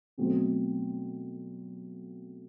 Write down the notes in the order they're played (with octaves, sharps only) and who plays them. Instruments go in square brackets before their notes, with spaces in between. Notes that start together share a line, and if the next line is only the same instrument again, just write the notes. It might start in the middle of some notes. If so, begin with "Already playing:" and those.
[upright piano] B2 F#3 A3 C4